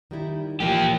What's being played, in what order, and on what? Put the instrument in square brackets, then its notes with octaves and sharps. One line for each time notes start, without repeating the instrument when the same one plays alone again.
[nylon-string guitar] D#3 G3 E4
[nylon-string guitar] A#2 E3 F3 [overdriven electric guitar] A#3 G4